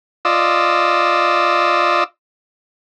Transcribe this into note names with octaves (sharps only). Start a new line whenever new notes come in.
F4 D5 D#5 E6